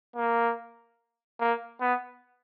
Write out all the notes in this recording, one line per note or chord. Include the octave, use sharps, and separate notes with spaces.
A#3
A#3
B3